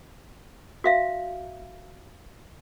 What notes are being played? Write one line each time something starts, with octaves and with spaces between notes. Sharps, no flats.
F#4 E5 F5